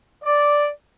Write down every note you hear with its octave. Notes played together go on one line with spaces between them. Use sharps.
D5